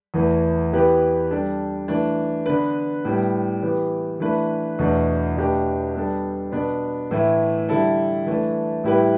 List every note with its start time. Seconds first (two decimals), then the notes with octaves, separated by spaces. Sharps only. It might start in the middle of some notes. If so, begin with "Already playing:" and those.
0.14 E2 E3 A3
0.73 E3 B3 G4 B4
1.31 G3 D4 A4
1.88 E3 A3 D4
2.46 D3 B3 D4 B4
3.05 A2 G3 B3
3.62 E3 B3 G4
4.20 E3 A3 D4 B4
4.79 E2 B2 A3 D4
5.36 B2 A3 D4 G4 B4
5.95 G3 B3 D4 A4
6.52 B2 B3 D4 B4
7.11 A2 E3 A3 E4
7.69 D3 G3 E4 A4
8.26 E3 A3 D4 A4
8.84 A2 G3 E4 G4 B4